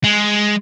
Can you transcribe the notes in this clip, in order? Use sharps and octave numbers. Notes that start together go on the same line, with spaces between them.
G#3